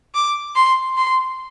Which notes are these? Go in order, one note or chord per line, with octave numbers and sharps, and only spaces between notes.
D6
C6
C6